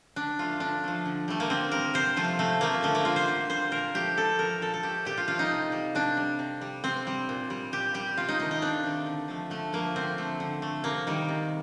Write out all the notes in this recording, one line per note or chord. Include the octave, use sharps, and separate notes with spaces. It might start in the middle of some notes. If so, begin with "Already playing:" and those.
D3 D4
F3 A3 F4
D3 D4
F3 A3
D3
G3 A3
A#3
D3 C4
G3 A#4
C3 C5
F3 A3 F4
C3 A3
F3 A3 A#3
D3 A3
A#3
G3 F4
C5
D3
G3 C5
A#2 A#4
F3 A3 G4
A#2 A4
F3 A3 A#4
A#2 A4
A4
F3 A3 G4
A#2 G4
F4
F3 A3 F4
D#4
C3
G3
C3 D4
G3
C3
G3
C3 C4
G3
A#2
G3
A#2 G4
G3 G4
C3 F4
D#4
D#3 A3 D#4
D#4
C3 D4
D#3 A3
D3
F3 A3
D3 A3
F3 A3 A#3
D3 C4
A3
D3
A3
C3 A#3
D#3 G3
C3